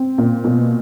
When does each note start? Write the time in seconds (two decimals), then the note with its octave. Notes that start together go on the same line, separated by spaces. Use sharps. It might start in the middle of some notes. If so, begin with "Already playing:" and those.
Already playing: C4
0.18 A#2
0.44 B2